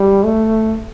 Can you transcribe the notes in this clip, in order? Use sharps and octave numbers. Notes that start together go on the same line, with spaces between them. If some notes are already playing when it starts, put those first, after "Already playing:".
Already playing: G3
A3